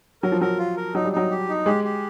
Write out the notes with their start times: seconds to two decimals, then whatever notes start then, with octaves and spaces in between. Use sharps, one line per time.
0.23 F#3 A#4
0.32 F3
0.41 F#3 A#4
0.58 F4
0.77 A#4
0.94 F#3 D#4
1.05 G3
1.13 F#3 D#4
1.31 G4
1.49 D#4
1.66 G#3 G4
1.84 G4